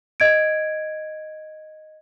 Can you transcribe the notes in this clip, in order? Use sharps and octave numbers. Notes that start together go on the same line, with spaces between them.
D#5 G#6 D7